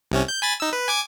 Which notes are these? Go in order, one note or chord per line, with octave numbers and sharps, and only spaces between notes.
C2 C3 C#4
G6
G#5 B5 A6
D#4 E6
B4
G#5 D6 G#6